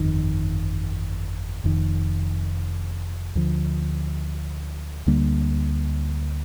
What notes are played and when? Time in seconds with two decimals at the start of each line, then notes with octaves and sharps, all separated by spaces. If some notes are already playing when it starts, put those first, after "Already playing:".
Already playing: G1 F2 D#3
1.64 F1 F2 D#3
3.35 D2 D3 F3
5.07 D2 D3 G3 A#3